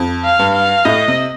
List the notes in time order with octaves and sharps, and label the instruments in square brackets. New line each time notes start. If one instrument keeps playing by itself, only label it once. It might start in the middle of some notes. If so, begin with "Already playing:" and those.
Already playing: [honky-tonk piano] F2
[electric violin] F5
[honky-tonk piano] G2
[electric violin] F5
[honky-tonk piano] A2 [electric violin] D#5
[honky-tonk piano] C3